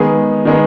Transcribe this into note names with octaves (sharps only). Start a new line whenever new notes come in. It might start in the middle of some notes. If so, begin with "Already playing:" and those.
Already playing: D#3 G#3 B3 G#4
D#3 G#3 B3